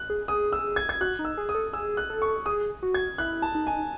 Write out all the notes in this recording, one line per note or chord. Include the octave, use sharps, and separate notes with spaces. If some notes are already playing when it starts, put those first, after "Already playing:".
Already playing: F#6
G#4
G#4 D#6
E6
G#6
G#6
F#4 F#6
D#4
E6
G#4
D#6
A4
G#4 E6
F#6
A4
C#6
G#4 D#6
F#4
G#6
E4 F#6
A5
D#4
G#5